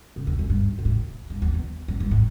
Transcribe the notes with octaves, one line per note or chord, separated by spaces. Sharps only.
C#3
E2
F#2
G2
B2
A2
G2
E2
E2
F#2
G2
A2